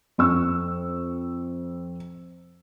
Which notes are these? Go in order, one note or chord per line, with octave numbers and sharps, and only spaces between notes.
F2 C#6 E6